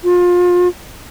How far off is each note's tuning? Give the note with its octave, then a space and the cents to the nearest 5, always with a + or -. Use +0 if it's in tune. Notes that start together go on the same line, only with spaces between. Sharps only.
F4 +30